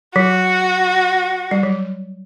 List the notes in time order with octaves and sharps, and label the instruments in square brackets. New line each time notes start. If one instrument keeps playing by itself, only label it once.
[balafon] F#3 [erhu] F#4
[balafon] G3
F#3